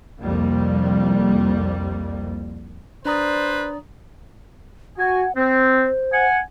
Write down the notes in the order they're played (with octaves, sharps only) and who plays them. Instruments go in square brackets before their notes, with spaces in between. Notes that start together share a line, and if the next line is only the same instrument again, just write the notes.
[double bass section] C2 F2 G3 A#3
[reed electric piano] D4 A#5 D#6 [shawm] B4 [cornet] C5 [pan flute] D5
[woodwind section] F#4 G#5 [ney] F#5
[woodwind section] C4 [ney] C5
[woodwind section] F#5 G#5